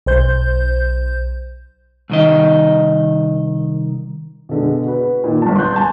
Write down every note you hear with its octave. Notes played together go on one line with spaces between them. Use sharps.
B1 C5 G6
C2 D#3 D#5
B2 D3 G#3
F#4 B4
A#2 D#3
G1 G3 A5
C6 C#6 F#6 G6
G#5 A5 C6 G6